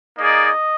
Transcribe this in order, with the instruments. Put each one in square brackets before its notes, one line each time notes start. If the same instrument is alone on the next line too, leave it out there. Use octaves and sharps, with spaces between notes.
[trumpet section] A#3 D#4 G#4 D5 [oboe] D#5